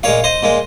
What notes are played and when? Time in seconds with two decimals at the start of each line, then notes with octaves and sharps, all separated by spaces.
0.03 A#2 G#3 C#5 F5
0.24 C5 D#5
0.43 A#2 G#3